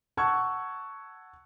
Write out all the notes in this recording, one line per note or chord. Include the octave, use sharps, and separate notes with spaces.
F#5 A5 C#6 E6 F#6 G#6